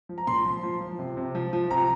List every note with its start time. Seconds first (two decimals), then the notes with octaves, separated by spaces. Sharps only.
0.09 F3
0.18 A#5
0.27 A#2 C6
0.45 F3
0.63 F3
0.81 F3
0.99 C3
1.17 C3
1.35 F3
1.53 F3
1.71 C3 A#5